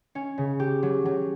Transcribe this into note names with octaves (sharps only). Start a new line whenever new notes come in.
C#4
C#3
G4
F#3
F#3